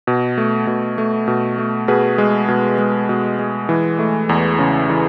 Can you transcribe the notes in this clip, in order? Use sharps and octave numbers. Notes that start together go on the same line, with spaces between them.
B2
A3
B2
A3
B2
A3
B2 G#4 B4
G#3
B2
G#3
B2
G#3
E3
A3
E2
C#3
E3